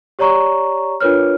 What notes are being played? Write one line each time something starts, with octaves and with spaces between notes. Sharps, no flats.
G4 C#5 D5 A#5 C#6
D4 F4 A#4 B4 C#5 F6